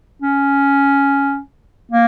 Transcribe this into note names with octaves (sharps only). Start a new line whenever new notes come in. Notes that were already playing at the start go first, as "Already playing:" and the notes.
C#4
A#3